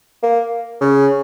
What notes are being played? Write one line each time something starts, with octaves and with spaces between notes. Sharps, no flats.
A#3
C#3